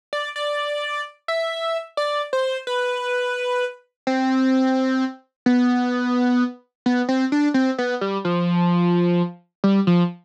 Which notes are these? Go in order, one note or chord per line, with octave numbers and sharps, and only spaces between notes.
D5
D5
E5
D5
C5
B4
C4
B3
B3
C4
D4
C4
B3
G3
F3
G3
F3